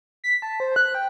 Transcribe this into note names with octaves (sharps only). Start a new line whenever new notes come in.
B6
A5
C5
F#6
G5